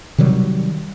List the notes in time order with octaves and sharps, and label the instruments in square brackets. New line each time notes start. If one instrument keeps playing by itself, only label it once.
[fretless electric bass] C3 D#3 F#3 G3